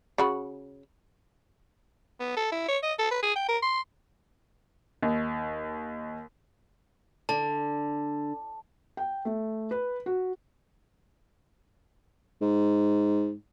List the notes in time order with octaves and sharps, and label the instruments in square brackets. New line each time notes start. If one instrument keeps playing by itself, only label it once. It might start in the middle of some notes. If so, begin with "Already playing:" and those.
[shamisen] C#3 F#4 B5
[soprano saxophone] B3
A4
E4
C#5
D#5
A4
B4
G#4
G5
A#4
C6
[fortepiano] D#2
[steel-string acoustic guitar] D3 [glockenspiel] A5
[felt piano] G5
A3
B4
F#4
[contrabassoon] G#2